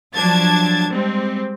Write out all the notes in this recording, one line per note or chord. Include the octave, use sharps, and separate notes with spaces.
F3 F#3 D4 A5 G#6 A6
G3 G#3 C4